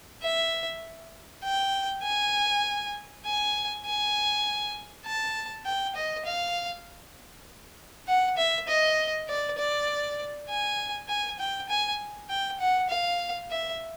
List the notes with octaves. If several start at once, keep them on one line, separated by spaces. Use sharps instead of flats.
E5
G5
G#5
G#5
G#5
A5
G5
D#5
F5
F#5
E5
D#5
D5
D5
G#5
G#5
G5
G#5
G5
F#5
F5
E5